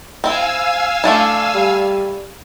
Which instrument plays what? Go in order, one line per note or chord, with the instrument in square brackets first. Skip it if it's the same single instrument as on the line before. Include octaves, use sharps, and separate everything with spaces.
[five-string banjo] C4 E4 [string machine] F5 G#5 E6
[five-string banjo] A3 D4 E4
[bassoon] G3